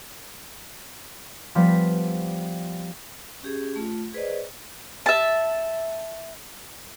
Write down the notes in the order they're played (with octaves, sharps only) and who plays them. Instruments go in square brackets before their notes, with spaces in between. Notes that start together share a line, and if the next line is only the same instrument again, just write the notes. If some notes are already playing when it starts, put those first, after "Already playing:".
[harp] F3 G3 B3 B6
[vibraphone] C#4 G4 G#4
A3 F4
G#4 B4 C5 D5 D#5
[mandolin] E5 A5